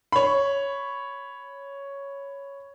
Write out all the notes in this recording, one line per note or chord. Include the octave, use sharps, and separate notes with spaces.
C#5 B5